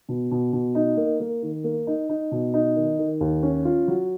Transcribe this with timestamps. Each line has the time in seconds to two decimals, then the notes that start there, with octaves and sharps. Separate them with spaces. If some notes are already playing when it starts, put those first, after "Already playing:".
0.09 B2
0.31 B2
0.53 B2
0.75 D#4
0.97 A#3
1.20 A#3
1.43 D#3
1.64 A#3
1.87 D#4
2.09 D#4
2.32 B2
2.54 D#4
2.76 D#3
2.99 D#3
3.21 D#2
3.43 C#4
3.65 F4
3.88 F#3